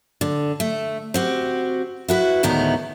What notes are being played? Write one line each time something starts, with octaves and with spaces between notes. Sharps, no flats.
D3
A3
C4 F#4 G4
E4 F#4 B4
D2 A2 D#3 G#3 B3 A#5